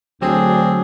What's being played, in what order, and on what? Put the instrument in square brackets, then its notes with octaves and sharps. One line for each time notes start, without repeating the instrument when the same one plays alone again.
[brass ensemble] D2 [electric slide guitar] F#3 [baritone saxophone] C4 [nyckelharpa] D4 G#4